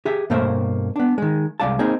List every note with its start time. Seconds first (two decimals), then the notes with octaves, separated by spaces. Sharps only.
0.05 G4 G#4 E5
0.30 G2 B2 A3 A#3 C5 E5
0.96 B3 D4
1.18 D#3 G#3
1.60 C2 F2 G#3 D5 F5 A5
1.79 A#3 C4 D#4 G#4